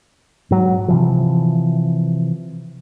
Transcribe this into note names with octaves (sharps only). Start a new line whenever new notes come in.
G#2 F#3
C3 E3 F3